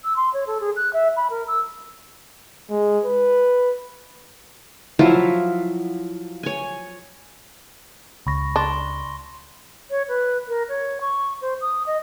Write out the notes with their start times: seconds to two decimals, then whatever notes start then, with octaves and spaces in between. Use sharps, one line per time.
0.04 E6
0.16 C6
0.34 C#5
0.47 A4
0.60 G#4
0.76 F#6
0.93 E5
1.17 B5
1.30 A#4
1.48 E6
2.70 G#3
3.04 B4
4.99 F3 F#3 E4 F4
6.43 C#5 G#5
8.27 C#2 B5 C#6 A#6
8.56 D4 C6 G7
9.90 C#5
10.09 B4
10.48 A#4
10.69 C#5
11.01 C#6
11.42 C5
11.61 D#6
11.87 D#5